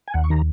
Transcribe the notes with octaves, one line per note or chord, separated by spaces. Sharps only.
G#5
D#2 F#5
C#6
D#3 A#5